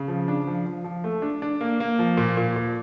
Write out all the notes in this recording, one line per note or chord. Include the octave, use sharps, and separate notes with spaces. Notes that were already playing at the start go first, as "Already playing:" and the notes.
Already playing: C#3
F3
D4
F3
F3
F3
A3
D4
D4
A#3
A#3
F3
A#2
A#2
A#2